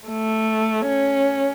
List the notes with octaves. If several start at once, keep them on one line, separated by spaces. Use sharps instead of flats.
A3
C#4